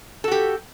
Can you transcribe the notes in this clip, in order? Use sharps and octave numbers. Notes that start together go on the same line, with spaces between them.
F#4 G4 A4